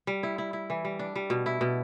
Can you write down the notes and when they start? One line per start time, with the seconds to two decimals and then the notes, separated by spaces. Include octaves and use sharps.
0.07 G3
0.23 E4
0.38 E4
0.53 E4
0.70 E3
0.85 G3
0.99 D4
1.16 G3
1.30 B2
1.46 E4
1.61 B2